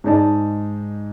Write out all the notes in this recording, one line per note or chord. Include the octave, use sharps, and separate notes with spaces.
G#2 G#3 D#4 D5 A5